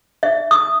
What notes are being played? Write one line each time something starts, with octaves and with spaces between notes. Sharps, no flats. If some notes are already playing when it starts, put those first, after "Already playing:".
E5
D#6